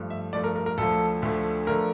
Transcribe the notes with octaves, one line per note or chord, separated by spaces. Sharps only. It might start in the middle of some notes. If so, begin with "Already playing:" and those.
Already playing: G2 F3 A3
E5
G2 F3 A3 D5
A#4
A#4
A#4
D2 D3 F3 A3 A4
D2 D3 F3 A3
D3 F3 A3 A#4